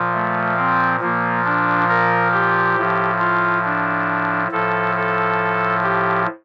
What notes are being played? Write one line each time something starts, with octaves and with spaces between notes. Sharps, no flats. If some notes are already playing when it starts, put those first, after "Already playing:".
Already playing: A#2 F3
A3
C4
A#2 F3 A#3
D4
A#4
G4
A2 F3
F4
D4
A2 F3 A4
A4
G4